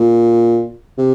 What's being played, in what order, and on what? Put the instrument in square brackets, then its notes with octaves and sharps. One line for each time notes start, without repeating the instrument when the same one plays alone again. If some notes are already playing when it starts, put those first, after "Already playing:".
Already playing: [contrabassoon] A#2
C3